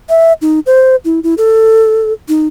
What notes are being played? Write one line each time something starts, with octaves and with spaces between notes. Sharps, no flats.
E5
D#4
C5
E4
E4
A4
D#4